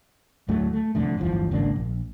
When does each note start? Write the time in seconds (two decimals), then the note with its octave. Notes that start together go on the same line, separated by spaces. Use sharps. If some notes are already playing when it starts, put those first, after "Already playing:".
0.48 D2 A2 F#3 A3
0.73 A3
0.95 C2 F2 D3 A3
1.17 D1 G1 E3 F3
1.51 G#1 C#2 A#3 D4
1.76 A#1